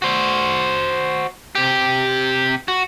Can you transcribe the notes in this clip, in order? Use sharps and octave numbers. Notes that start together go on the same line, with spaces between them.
F#4 C5
C3 G4
F#4